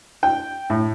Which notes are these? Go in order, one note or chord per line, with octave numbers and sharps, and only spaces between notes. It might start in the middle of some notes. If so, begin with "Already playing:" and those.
G5
A2